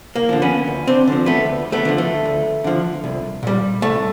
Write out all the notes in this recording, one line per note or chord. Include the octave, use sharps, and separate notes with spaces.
A#3
D3 F3
B3 C#4
D2
C4 D4
D3 F3
A3 B3
D2
A3 B3
D3 F3
A3
D2
D3 F3
C2
A#2 G3
C2 A3